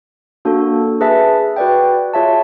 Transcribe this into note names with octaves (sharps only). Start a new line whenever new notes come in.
A#3 D4 F#4 A4
G#4 B4 E5 A5
F#4 B4 D5 G5
F4 G#4 C#5 E5 A5